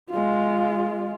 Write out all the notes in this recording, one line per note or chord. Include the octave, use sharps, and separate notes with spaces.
G#3 F4